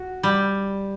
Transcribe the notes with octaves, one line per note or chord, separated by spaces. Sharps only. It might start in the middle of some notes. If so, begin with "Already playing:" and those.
Already playing: F#4
G3